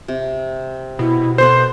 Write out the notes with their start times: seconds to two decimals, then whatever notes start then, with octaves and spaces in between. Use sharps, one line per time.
0.08 C3
0.99 B2 E4
1.38 B3 A4 B4 C5 C6